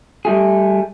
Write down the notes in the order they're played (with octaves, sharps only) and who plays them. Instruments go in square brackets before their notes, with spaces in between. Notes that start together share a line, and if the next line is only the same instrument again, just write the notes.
[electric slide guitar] G3 A3 G#4